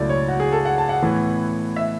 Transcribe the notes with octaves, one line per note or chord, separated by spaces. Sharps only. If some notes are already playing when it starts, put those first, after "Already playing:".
Already playing: C#2 B2 F#3 A3 E4 D5
C#5
F#4
G#4
A4
F#5
A5
F#5
A2 E3 B3
E5